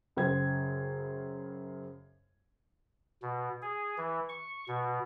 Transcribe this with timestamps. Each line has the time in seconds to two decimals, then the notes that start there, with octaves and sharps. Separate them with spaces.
0.17 F#2 C#3 C5 G5 G#6
3.22 B2
3.62 G#4
3.98 E3
4.29 C#6
4.68 B2